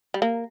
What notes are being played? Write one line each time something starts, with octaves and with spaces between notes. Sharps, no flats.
G3
A#3